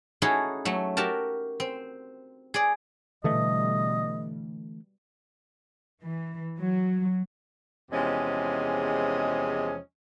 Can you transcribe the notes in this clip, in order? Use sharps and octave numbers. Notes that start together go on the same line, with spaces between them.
C#4 D#4 E4 F#4 G#4 A4
F#3 A3
F#4 G4 A#4 A5
C4
G#4 D5
B2 D3 E3 G3 A3 D#5
E3
F#3
E2 C3 F3 G#3 C#4 D#5